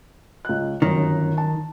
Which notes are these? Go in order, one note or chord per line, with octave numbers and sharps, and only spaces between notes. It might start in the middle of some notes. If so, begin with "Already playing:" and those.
C#2 F#6
G1 F#2 D#3
A5